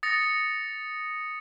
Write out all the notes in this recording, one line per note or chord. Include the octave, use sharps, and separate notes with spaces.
D#6 A6 A#6 C#7